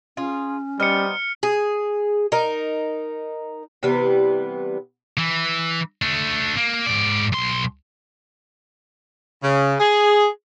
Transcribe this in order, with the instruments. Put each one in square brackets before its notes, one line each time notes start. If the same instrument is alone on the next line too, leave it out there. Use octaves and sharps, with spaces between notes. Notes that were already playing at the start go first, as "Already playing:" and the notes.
[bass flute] C#4 [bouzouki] F4 G#4
[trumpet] G3 [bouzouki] B3 D#4 C5 [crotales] F6 C#7
[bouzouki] G#4
D#4 A#4
C3 E3 G3 B3
[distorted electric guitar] E3
A3 D4
A#3
G#2 D5
B1 C6
[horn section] C#3
G#4